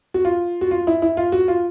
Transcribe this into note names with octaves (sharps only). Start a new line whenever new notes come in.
F#4
F4
F#4
F4
E4
E4
F4
F#4
F4